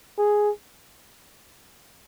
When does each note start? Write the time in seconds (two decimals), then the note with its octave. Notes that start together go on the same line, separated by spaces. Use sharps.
0.18 G#4